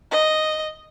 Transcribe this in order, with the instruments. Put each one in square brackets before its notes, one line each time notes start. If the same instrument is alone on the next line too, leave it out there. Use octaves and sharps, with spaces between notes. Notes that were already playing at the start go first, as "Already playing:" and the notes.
[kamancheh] D#5